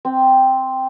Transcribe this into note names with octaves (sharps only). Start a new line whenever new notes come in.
C4